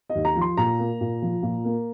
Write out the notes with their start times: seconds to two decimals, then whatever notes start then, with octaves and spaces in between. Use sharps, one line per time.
0.10 D#5
0.15 D#2
0.25 A#5
0.35 F3
0.41 C6
0.57 A#2 A#5
0.79 A#3
1.01 A#2
1.22 F3
1.42 A#2
1.65 A#3